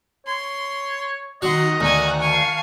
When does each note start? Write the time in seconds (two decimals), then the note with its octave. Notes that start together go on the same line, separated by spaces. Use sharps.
0.27 C#5 C6
1.42 D#3 F#3 D#5 F#5 A#5 C6 F#6
1.80 D2 F#4 G#5
2.21 F5 G#5 A5 C#6 C7